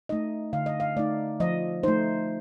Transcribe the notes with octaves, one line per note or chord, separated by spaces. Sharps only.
A3 D#4 D#5
D3 F5
D#5
F5
A3 D#4 D5
F3 D#5
A3 D#4 C5